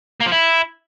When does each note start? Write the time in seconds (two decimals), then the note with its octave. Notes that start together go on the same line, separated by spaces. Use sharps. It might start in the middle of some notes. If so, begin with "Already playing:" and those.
0.20 A#3
0.26 F3
0.32 E4